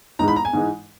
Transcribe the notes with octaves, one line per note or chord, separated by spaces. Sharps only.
G#2 E3 G#3 D#4 A#5
B5
A#5
G#5
G#2 E3 G#3 D#4